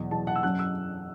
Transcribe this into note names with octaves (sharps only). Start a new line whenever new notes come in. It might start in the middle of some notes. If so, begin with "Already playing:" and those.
Already playing: E2 B2 F#3
E2 B2 F#3 A5
F#5
E6
F#2 F#3 C#4 F#6
E6